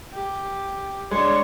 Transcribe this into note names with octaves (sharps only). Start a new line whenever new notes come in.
G4
G#3 D4 C#5